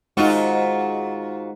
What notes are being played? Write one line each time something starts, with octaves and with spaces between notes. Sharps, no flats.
G#2 G#3 D#4 F4 F#4